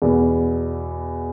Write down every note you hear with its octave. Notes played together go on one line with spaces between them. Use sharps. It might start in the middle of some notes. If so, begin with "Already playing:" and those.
E2 B2 B3